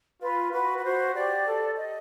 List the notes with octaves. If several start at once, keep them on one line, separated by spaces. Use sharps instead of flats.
F4 B4
F#4 B4
B4
F#4 C5
G4 D5
A4
D#5